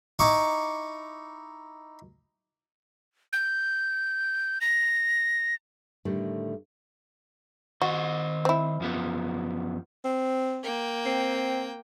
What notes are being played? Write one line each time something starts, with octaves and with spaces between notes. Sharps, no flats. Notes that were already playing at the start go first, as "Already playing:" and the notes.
D#4 E4 C#6 D6
G6
A#6
A2 D3 D#3 G3 A3
D#3 F#4 C5 D#5
C4 E4
F#2 F3 B3
C4
A#3 G5
C4